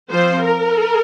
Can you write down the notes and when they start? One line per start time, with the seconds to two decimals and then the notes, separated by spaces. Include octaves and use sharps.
0.11 F3 C4 C5
0.43 A#4